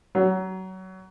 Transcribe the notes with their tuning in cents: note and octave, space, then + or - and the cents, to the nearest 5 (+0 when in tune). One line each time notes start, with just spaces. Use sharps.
F#3 +25